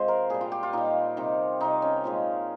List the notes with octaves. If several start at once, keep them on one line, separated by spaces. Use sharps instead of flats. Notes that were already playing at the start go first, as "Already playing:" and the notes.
Already playing: C3 F3 G#3 C5
A#4
A#2 G3 G#4
F4
G4
F4
A#2 G3 D#4
C3 D#3 G3
C3 D#3 G3 D#4
C#4
A#2 F3 G#3